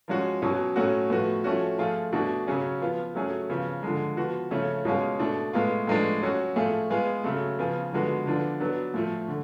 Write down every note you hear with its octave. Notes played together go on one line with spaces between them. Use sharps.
F3 G#3 C#4 F#4
B2 F#3 C#4
A2 F#3 C#4 F#4
A2 F3 B3 F#4
F3 A3 C#4 F#4
F3 A3 F4 G#4
B2 A3 D4 F#4
C#3 F#3 C#4 G#4
F3 B3 F4
F#3 A3 C#4 G#4
C#3 F3 B3
D3 F3 G#3
F3 B3 F#4
C#3 F3 A3 C#4
B2 G#3 C#4 F4 G#4
B2 A3 D4
A2 G#3 B3 F4
A2 F3 G#3 B3 D4
F#3 C#4 F#4
A2 F3 A3 F4 G#4
G#3 B3 F4 G#4
C#3 F#3 A3
C#3 F3 B3 F4 G#4
D3 F3 G#3 B3 F#4
D3 F3 B3 D4
F#3 B3 D4
A2 F3 A3
D3